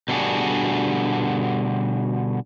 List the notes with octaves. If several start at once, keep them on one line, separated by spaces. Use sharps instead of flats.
B2 D3 G3 D4 F#4 G#4